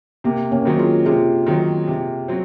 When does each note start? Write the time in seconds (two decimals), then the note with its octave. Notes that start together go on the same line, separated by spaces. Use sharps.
0.24 C3 A#3
0.51 A#3 C#4
0.65 D#3 F#3 C4
0.79 F4 G#4
1.06 C3 F4 G#4
1.46 D#3 F#3 C4
1.87 C3
2.28 F#3 C4